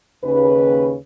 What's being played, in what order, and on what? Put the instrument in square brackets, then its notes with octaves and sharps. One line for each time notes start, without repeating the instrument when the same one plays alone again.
[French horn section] D#2 C#3 B4